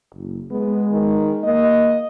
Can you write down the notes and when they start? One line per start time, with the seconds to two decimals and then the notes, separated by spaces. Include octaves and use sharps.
0.15 F#1
0.51 G#3 B3
0.91 D#3
1.45 A#3 D#5